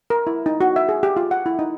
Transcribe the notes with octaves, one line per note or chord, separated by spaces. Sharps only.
A#4
E4
D#4
F#4
E5
G#4
G4
F4
F#5
E4
D#4